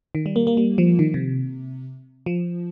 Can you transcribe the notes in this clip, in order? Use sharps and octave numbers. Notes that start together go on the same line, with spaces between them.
D#3
G3
A#3
A#3
G3
F3
D#3
C3
F3